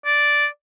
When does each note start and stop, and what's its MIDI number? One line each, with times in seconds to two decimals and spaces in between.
0.06 0.46 74